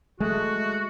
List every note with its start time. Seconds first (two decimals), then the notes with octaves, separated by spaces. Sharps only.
0.20 G#3 A3 F#4